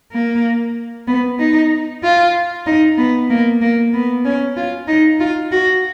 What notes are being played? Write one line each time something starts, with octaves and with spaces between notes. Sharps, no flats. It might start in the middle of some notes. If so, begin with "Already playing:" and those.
A#3
B3
D#4
F4
D#4
B3
A#3
A#3
B3
C#4
F4
D#4
F4
F#4